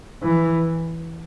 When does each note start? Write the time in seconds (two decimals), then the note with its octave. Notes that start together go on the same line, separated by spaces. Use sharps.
0.23 E3